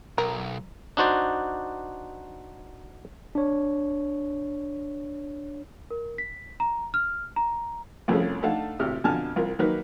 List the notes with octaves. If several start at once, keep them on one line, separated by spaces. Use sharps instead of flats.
B1 A#4
D4 D#4 F#4 C5 D5
D4 C#5
A#4
B6
A#5
F6
A#5
C2 F2 A3 C#4 G#4
A3 D4 D#4 A4 F5 F#5
G#1 A2 C3 G4 F6
F2 B2 D3 G#5 A5 F6
C2 F4 A#4
D#3 F#3 A#3 D#4 A#4 B4